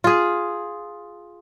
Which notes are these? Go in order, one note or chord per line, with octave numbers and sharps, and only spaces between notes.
F4 G#4